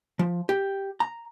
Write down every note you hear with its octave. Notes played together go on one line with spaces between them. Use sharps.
F3
G4
A#5